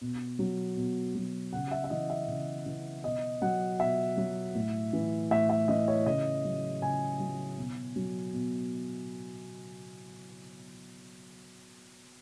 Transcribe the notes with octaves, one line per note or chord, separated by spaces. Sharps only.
B2
F#3
B2
F#3
C#3 F#5
F#5
E5
E5
E3 D#5
E5
C#3
E3
B2 D#5
F#3 F#5
B2 E5
F#3
A2
E3
A2 E5
E5
E3 D#5
C#5
C#3 D#5
F#3
C#3 G#5
F#3
B2
F#3
B2